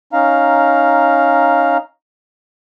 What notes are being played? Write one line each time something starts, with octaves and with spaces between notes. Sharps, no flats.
C#4 D#4 F5 A#5